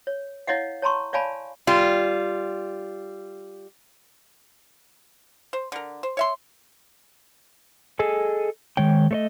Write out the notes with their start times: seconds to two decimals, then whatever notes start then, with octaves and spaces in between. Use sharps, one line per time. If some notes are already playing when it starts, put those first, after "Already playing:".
0.07 C#5
0.47 E4 C#5 D#5 F5 F#5
0.82 C#5 A5 A#5 C6 C#6
1.13 C#5 D5 F5 G#5 A5 B5
1.67 G3 F4
5.53 C5
5.72 D3 A#4
6.03 C5
6.17 C#5 E5 C6
7.99 G#4 A4 D#5 G#5
8.77 D#3 G#3 C#5 G5
9.11 A3 C#5 D#5